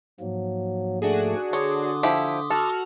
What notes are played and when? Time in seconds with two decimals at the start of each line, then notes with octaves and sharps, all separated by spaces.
0.20 G#2 F3 F#3 A#3
1.02 A3 D4 F#4 G#4
1.53 D3 C#5 C6 D6 D#6
2.03 F3 E4 G4 B6
2.50 F#4 A4 F6